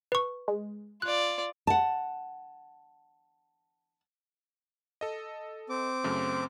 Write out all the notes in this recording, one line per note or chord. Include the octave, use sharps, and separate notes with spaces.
B4 C#6
G#3
F4 D5 F#6
F#5 A5
A4 D#5
C4 D6
F#2 C#3 A3